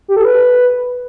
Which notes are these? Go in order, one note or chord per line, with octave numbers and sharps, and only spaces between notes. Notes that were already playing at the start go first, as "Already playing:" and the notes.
G4
A4
B4